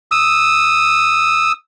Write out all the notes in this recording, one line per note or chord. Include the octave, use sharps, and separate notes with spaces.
D#6 E6